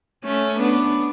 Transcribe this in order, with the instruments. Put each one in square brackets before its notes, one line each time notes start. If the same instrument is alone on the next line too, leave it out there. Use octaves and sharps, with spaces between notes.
[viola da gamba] A3 C#4
B3 D4